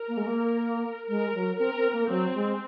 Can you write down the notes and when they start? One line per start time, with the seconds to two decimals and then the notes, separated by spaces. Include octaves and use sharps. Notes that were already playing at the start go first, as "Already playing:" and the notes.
Already playing: A#4
0.08 A#3
0.17 G#3
0.27 A#3
1.09 G#3 A#4
1.35 F#3
1.59 C4 A#4
1.76 C4
1.93 A#3
2.09 F#3 C4
2.35 G#3